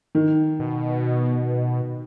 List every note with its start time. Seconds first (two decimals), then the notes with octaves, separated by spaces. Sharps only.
0.15 D#3
0.59 B2